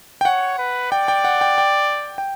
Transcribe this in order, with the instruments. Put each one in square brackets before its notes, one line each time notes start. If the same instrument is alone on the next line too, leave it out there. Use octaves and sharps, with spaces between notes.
[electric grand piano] G5
[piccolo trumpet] C#5 [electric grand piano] F#5
[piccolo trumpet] B4
[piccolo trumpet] D5 [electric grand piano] G5
[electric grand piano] G5
F#5
G5
G5
G5